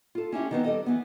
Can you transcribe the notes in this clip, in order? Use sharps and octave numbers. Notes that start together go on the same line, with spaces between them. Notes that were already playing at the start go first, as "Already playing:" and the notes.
F4 A4
C#4 D4 E4 G4
D#3 B3 C4
G3 A4 D#5
E3 B3